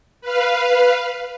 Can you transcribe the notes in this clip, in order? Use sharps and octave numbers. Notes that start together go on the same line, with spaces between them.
B4 F5